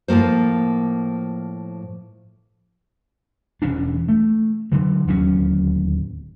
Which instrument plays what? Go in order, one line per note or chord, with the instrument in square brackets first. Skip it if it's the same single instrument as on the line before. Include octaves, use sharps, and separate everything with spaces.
[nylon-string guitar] A2 F3 G#3 A#3 C5
[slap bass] E1 E3 C#4 D4
A3
D3 E3 F#3
D1 D#2 F#3 C#4